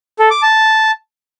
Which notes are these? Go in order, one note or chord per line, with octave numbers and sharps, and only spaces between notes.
A4
D6
A5